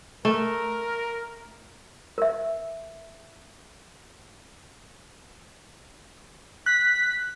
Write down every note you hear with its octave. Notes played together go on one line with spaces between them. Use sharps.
A3 A#4
A#4 E5
F#6 B6